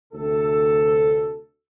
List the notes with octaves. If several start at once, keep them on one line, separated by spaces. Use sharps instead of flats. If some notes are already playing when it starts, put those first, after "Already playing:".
D2 C3 A4